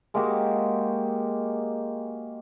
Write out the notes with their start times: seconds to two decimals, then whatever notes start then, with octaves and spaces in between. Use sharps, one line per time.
0.14 G#3 A#3 F#4 G4